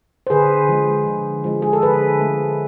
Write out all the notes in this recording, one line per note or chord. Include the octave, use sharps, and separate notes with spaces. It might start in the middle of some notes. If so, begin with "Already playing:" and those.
C5
D3 G#4 B4
F3 G#3
D3
F3 G#3
G#4
A4
D3 G#4 B4
A3